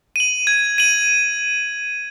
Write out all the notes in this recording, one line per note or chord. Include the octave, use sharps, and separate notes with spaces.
D#7 F#7
G#6
D#7 F#7